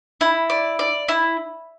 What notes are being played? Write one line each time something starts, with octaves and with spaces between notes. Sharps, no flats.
E4
D5
D5
E4